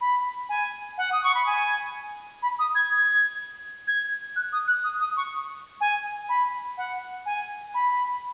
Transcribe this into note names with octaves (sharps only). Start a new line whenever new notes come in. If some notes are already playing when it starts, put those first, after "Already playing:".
B5
G#5
F#5
D#6
C#6
B5
G#5
B5
D#6
G#6
G#6
G#6
F#6
D#6
F#6
D#6
D#6
C#6
G#5
B5
F#5
G#5
B5